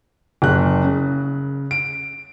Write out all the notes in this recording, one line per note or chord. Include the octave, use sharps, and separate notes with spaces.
F#1 F#6
C#3
D7